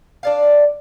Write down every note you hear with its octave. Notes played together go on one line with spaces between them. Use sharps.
D4 D5 F5